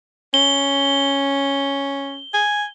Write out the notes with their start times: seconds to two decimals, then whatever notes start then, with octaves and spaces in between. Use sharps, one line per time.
0.34 C#4 G7
2.34 G#5